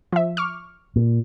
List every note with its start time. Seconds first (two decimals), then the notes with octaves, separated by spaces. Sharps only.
0.12 F3 E5
0.37 C#6 D6 F6
0.96 A#2